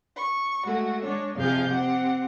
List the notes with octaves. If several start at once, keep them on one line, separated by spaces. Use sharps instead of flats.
C#6
G#3 A3 F#4
G#3 D4 C#5
F2 C3 F3 G#4 F5 G6
C4 G4 F#5